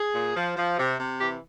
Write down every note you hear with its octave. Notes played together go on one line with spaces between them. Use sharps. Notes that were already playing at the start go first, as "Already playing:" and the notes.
Already playing: G#4
A#2
F3
F3
C3
C3
E3 G4